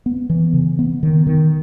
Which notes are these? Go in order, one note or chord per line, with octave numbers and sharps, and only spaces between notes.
B3
E3
C#3
B3
D#3
D#3